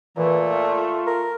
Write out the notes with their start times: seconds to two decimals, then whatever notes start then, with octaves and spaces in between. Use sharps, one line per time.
0.17 A#2 E3 A3
0.50 F4
1.07 A#4